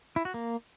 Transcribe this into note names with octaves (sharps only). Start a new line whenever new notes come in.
E4
F#4
A#3